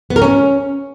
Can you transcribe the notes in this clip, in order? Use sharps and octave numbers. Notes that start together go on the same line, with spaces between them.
B3
A#4
C#4